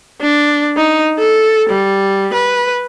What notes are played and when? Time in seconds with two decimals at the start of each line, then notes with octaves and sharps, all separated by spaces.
0.22 D4
0.77 D#4
1.19 A4
1.69 G3
2.34 B4